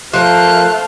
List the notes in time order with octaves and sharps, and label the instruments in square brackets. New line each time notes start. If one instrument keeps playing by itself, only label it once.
[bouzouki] F3 A#4 [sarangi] A3 [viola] C5 F5 [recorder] F#6